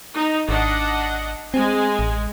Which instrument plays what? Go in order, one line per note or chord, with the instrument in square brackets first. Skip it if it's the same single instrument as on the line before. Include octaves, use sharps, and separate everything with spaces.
[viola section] D#4
[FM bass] G#1 [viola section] D4 D#5 F#5
[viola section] G#3 G#5 [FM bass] C4
[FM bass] A1